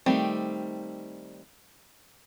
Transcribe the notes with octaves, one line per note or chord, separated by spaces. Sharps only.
D#3 G3 A3 C4